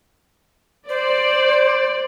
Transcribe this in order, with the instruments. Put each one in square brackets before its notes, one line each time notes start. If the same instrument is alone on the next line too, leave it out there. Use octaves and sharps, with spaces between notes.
[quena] C5 [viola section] D5